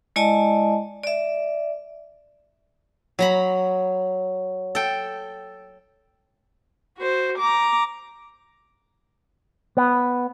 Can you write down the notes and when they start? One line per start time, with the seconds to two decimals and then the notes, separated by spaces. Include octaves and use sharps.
0.16 G#3 E4 D5 D#5 G#5 A5
1.03 D5 E5
3.19 F#3 A#5 B5
4.75 A4 G5
6.98 F#4 C5
7.39 A#5 D6
9.77 B3